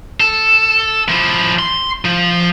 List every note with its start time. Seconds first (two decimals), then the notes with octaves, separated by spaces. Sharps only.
0.20 A4
1.09 F3 E4
1.59 C6
2.05 F3